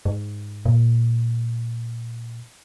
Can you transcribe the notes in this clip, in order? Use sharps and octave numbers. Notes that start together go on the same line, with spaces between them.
G#2
A#2